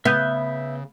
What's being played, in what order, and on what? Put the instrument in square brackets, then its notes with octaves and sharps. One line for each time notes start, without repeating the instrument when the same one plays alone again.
[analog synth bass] C#3 [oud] B3 [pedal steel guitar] E5 G6